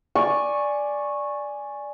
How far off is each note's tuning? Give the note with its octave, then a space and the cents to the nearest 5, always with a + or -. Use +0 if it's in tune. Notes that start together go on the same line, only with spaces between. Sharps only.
D5 +0 G#5 +0 C#6 -10